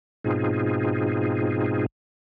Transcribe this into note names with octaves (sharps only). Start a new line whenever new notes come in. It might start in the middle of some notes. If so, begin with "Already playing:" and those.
G#2 B2 C4 D#4 F4 G#4